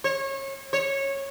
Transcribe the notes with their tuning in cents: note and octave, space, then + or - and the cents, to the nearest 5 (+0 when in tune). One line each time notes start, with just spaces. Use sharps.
C#5 -30
C#5 -15